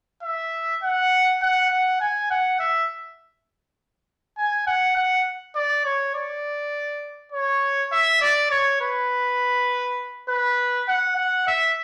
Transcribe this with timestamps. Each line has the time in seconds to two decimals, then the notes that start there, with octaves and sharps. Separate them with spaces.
0.23 E5
0.83 F#5
1.42 F#5
1.71 F#5
2.01 G#5
2.31 F#5
2.59 E5
4.38 G#5
4.67 F#5
4.96 F#5
5.55 D5
5.85 C#5
6.15 D5
7.32 C#5
7.92 E5
8.21 D5
8.51 C#5
8.81 B4
10.29 B4
10.88 F#5
11.16 F#5
11.47 E5